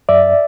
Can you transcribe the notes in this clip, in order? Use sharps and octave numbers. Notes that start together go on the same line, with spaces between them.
F#2 D5 E5